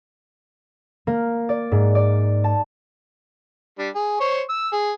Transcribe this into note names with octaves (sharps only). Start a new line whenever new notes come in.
A#3
D5
G#2
D5
A5
G3 D4
G#4
C5 C#5 C#6
E6
G#4